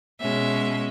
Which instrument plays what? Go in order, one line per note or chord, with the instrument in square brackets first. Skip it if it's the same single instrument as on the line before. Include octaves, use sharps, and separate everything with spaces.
[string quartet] B2 G#3 C#4 E5